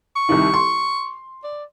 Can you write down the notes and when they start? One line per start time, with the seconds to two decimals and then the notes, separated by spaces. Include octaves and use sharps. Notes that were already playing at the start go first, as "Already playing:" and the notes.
0.16 C#6
0.29 C2 C3 D#3
0.54 C6
1.44 D5